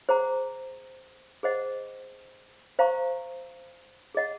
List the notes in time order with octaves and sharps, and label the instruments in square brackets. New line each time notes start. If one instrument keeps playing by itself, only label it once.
[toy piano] G#4 C5 F#5 A#5
G#4 C5 D#5 F#5
C5 F5 A#5 C#6
G#4 D#5 F#5